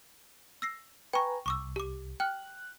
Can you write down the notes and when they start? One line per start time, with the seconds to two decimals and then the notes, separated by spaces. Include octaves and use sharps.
0.62 E6 A#6 C7
1.13 B4 G5 G#5 A#5 C#6
1.46 C2 C#6 D6 E6
1.76 G4 D6
2.20 G5 F6 F#6